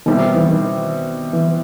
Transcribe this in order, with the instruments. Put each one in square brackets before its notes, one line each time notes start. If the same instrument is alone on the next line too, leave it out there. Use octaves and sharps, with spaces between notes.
[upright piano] B2 G3 C4 E4 [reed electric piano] D#3
[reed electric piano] E3
D#3
E3